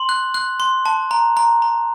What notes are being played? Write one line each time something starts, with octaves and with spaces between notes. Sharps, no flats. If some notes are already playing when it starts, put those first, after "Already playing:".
Already playing: C6 F#7
F#6
F#6
C6
A5
A#5
A#5
A#5